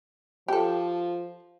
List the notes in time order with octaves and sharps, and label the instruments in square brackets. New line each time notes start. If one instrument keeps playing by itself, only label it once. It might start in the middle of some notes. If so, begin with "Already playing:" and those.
[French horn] F3 [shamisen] G4 A4